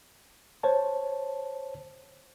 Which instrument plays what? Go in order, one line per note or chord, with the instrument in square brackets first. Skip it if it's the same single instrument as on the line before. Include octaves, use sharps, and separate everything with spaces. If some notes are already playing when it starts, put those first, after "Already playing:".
[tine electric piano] C5 C#5 A5